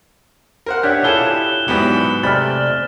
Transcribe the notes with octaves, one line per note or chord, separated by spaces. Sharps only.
A#4 C5 F#5
D4 G4 C#5 E5 F#5 F#6
D4 E4 F4 G#4 A4 E7 G7
E4 G4
G#2 F#3 B3 E4 G4 D5 B5
C3 G#3 A3 D5 B5 F6 A6